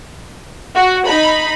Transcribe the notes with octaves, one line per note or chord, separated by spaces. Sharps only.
F#4
D#4 B5